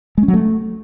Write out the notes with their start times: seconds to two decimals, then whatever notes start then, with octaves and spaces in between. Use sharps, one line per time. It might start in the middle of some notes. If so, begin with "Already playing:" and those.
0.18 G#3
0.23 C#4
0.28 F#3
0.33 A3